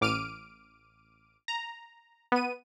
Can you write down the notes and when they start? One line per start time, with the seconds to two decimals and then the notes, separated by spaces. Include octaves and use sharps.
0.01 A1 D6 F6 D7 D#7
1.48 A#5
2.32 B3 D#7